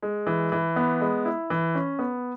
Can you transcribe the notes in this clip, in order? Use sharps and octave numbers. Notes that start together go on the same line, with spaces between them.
G#3
E3
E3
B3
G#3
E4
E3
C#4
B3